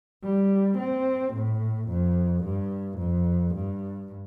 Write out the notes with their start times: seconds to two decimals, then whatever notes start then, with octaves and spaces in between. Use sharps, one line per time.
0.24 G3
0.78 C4
1.33 A2
1.88 F2
2.44 G2
2.98 F2
3.54 G2